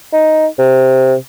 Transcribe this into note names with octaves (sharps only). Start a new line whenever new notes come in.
D#4
C3